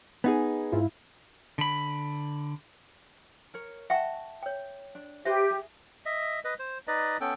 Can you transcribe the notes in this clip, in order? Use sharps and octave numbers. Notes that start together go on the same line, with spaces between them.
B3 D#4 G#4 G#5
G#2 E4 F4
D3 B5
A#4 C#5
E5 F#5 G5 A5 C#6
C#5 G5
D4
G4 B4 C5 E5 G5
G#4
D#5 E5
B4 D#5
C5
D#4 B4 D5 D#5
B3 C#4 A4 G5